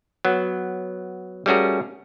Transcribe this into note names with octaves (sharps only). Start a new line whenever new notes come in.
F#3 B3
G3 A3 C#4 F#4 G#4 A#4